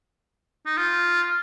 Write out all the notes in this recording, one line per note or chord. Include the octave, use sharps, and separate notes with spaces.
D#4
F4